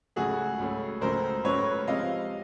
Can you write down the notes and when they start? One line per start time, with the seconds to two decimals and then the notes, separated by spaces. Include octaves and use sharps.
0.16 C#2 C#3 F#3 A3 F#4 G#4
0.59 C#2 C#3 F#3 A3
1.01 C#2 C#3 F#3 A3 A#4 C5
1.44 C#2 C#3 F#3 A3 B4 C#5
1.87 C3 F3 G#3 C4 D#5 F5